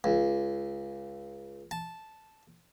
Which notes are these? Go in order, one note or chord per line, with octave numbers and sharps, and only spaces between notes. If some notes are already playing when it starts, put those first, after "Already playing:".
C#2
A5